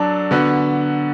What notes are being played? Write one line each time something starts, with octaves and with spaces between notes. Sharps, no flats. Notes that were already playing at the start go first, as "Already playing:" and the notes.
Already playing: F#3 D4 A4
D3 B3 F#4